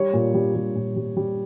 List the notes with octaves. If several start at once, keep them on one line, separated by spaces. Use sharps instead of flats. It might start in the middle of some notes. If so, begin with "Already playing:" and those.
Already playing: G3 C#5
A#2
G3
G3
A#2
G3
G3